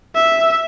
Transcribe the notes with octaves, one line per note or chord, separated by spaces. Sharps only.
E5